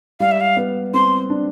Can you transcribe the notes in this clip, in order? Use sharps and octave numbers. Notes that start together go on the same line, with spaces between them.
G3 F5
E5
F5
B3
C4 C6
D4